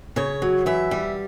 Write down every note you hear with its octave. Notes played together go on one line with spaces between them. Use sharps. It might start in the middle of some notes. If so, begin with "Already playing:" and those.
C#3 C#5
F#3
E3 E5
G3